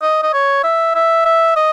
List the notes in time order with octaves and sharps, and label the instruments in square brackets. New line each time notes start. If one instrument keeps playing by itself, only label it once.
[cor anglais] D#5
D#5
C#5
E5
E5
E5
D#5